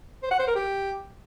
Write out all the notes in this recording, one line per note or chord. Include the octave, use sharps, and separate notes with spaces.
C5
F#5
C5
A#4
G4